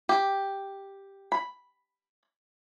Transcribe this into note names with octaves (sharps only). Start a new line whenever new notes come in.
G4
B5